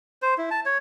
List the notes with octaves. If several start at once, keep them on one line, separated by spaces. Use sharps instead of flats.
C5
E4
A5
C#5